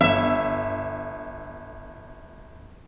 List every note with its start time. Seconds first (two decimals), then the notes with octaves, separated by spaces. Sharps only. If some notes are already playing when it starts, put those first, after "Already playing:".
0.01 G1 E5